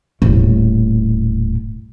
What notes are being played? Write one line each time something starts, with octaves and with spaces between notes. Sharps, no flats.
D#1 A2